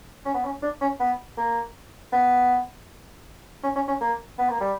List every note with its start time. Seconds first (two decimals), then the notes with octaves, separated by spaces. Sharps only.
0.25 C#4
0.34 B3
0.45 C#4
0.62 D4
0.81 C#4
1.00 B3
1.37 A#3
2.13 B3
3.63 C#4
3.75 C#4
3.88 C#4
4.01 A#3
4.38 B3
4.50 A#3
4.61 G3